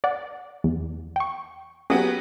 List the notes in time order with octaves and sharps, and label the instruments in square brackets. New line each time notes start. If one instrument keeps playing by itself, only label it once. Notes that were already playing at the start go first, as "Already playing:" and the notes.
[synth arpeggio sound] D5 F#5
E2
G5 C#6
[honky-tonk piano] F#3 B3 G4 [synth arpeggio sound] C#4 G#4